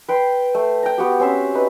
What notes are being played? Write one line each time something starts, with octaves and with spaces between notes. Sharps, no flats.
B4 G5 C6
A3
G5 A#5
B3 F#4 G4
C4 C#4 C5 E5
D#4 B4